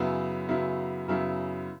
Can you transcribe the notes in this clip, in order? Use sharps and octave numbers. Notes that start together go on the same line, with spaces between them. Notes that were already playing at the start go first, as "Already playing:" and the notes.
Already playing: F#2 C#3 F#3 B3 E4
F#2 C#3 F#3 B3 E4
F#2 C#3 F#3 B3 E4